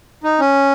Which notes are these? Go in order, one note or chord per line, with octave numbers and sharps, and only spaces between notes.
D#4
C#4